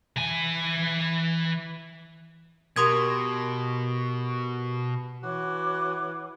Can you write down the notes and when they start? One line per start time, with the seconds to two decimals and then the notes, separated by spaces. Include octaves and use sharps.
0.16 E3 G#5
2.76 B2 G4 A#4 F#5 C6 D#6 G#6
5.23 E3 F#4 C#5 D6 F#6